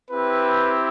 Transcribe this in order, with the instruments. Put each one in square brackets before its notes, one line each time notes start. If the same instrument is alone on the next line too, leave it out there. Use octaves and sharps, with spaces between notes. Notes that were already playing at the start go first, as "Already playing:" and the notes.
[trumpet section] C4 E4 G4 B4